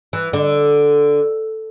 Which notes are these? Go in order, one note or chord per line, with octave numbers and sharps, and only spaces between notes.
E3
D3